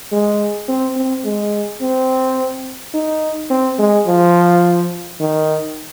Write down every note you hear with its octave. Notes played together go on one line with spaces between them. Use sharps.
G#3
C4
C4
G#3
C4
D#4
C4
G#3
F3
D#3